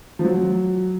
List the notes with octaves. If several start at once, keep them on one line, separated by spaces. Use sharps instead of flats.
F3
F#3